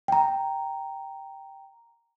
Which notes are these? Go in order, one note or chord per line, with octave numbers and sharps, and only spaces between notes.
G5 A#5